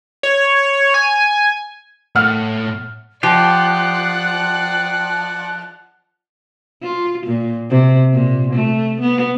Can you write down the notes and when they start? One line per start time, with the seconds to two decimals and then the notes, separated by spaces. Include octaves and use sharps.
0.23 C#5
0.94 G#5
2.15 A2 F#5 F6
3.23 F3 F4 G4 D5 F#5 F#6
6.82 F4
7.26 A#2
7.70 C3
8.14 A#2
8.53 A3
9.01 B3